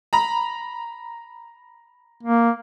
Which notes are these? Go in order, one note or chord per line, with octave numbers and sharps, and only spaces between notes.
A#5 B5
A#3